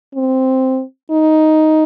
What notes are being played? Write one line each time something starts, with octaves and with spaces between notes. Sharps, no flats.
C4
D#4